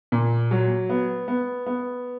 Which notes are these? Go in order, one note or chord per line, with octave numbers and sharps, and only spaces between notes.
A#2
F#3
B3
B3
B3